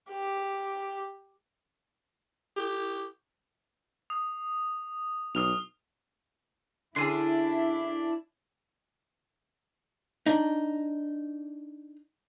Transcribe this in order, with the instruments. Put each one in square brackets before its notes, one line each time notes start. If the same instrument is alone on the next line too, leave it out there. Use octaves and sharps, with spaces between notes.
[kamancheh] G4
[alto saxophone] G4
[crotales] D#6
[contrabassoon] B1 [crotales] D#6 F6 F7
[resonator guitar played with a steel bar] D3 C#4 G#4 [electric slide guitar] D4 [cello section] E4 [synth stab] C6 D#7
[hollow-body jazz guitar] D4 D#4